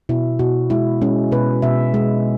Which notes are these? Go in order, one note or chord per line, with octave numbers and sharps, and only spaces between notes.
B2 E4
B2 F#4
G#3 E4
G#3 C#4
B2 B4
B2 E5
G#3